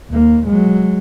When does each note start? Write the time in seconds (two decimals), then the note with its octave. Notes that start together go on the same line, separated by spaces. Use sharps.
0.11 D#2 A#3
0.47 F#3 G#3